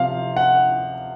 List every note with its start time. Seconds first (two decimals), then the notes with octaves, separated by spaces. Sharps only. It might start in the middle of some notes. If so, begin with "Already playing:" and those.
Already playing: C3 F3 F5
0.37 F#5